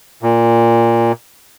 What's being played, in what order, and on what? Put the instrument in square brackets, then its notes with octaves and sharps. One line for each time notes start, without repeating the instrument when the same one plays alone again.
[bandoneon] A#2